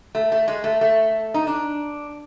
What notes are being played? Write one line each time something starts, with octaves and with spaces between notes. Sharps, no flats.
A3
A3
G#3
A3
A3
D#4
D4